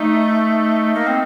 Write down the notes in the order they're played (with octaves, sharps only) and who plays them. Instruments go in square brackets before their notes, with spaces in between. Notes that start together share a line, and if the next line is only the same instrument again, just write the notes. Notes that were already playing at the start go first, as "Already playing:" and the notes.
Already playing: [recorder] A3 [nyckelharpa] D#4
[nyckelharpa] D#4
[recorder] A#3
C4